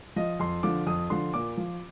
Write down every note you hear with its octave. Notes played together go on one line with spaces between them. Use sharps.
F3 D#5
F2 C6
D3 F3 D6
F2 D#6
D3 F3 C6
A#2 D6
F3